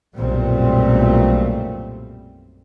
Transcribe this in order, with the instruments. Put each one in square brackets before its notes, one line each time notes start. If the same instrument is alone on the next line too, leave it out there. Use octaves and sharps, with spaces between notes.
[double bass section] B1 F#2 A#2 G3 A3 C4